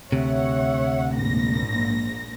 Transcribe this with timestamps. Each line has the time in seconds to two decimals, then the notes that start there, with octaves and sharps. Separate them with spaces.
0.12 D2 C3 C#5 E5 F#5
1.13 A#1 G#2 A#6